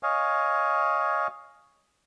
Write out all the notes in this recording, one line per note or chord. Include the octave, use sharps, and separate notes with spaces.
C#5 D#5 F5 G#5